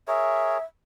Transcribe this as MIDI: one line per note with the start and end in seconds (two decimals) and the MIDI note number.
0.08 0.58 68
0.08 0.58 70
0.08 0.58 73
0.08 0.63 76